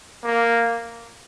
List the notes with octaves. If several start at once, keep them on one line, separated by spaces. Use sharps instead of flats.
A#3